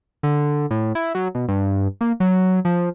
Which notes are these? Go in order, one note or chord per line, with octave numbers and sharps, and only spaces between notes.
D3
A2
E4
F#3
B2
G2
A#3
F#3
F3